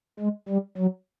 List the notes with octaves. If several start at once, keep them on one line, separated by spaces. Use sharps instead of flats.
G#3
G3
F#3